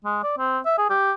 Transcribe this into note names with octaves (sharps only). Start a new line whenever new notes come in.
G#3
D5
C4
E5
G#4
G4